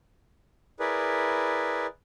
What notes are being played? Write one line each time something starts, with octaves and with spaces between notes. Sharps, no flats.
E4 G#4 A#4 B4 D5